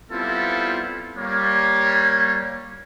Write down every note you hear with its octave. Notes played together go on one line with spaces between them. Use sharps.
G3 B3 C4 E4 F4 A4
G3 A#3 C#5